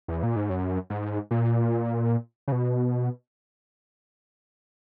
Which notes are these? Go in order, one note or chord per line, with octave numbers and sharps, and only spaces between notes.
E2
A#2
G#2
F#2
G#2
A#2
C#3
B2